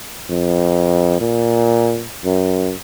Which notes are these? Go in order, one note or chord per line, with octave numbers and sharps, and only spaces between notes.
F2
A#2
F#2